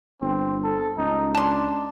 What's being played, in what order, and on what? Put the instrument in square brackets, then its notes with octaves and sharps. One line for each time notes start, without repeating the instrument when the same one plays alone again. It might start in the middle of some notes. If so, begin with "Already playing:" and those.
[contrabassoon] G1 [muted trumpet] C4
[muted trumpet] A4
[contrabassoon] C#2 [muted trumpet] D#4
[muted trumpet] D4 [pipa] A5 C6